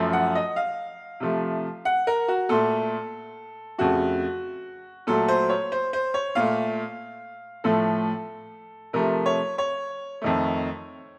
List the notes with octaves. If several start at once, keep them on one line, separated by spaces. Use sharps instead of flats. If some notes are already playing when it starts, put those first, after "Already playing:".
Already playing: F#2 F3 A3
F#5
D#5
F5
C3 F3 A3
F#5
A#4
F#4
A#2 A3 A4
F2 C#3 A3 F#4
A#2 F#3 A3 A4
C5
C#5
C5
C5
C#5
A#2 A3 F5
A2 F3 A3 A4
C3 F3 A3 A#4
C#5
C#5
F2 D#3 A3